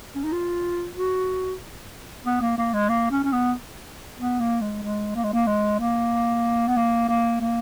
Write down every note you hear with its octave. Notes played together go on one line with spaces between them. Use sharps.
C#4
D#4
F4
F#4
B3
A#3
A#3
G#3
A#3
C#4
C#4
B3
B3
A#3
G#3
G#3
A#3
G#3
A#3
G#3
A#3
B3
A#3
A#3
A#3